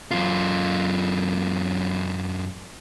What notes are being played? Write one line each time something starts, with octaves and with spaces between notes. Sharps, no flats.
F#2 F4